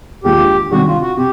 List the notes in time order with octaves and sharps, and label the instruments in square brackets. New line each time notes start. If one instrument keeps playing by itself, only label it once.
[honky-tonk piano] D#2 D3 F3 G#3 [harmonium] G4
[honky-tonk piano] C3 D#3 G3 [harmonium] F#4
[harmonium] F4
F#4
[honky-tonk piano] C3 [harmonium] G4